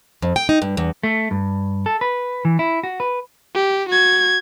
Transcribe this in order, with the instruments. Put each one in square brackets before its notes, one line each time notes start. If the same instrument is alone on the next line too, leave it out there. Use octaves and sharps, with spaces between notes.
[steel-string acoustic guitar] F2
G5
D#4
G2
E2
[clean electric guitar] A3
G2
A4
B4
E3
E4
F#4
B4
[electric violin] G4
F#4 G#6